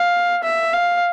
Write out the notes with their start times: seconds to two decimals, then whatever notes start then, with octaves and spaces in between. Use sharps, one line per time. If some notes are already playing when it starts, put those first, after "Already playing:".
Already playing: F5
0.43 E5
0.73 F5